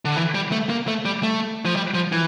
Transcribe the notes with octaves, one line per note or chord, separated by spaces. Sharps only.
D3
E3
G3
A3
A#3
A3
G3
A3
F3
G3
F3
E3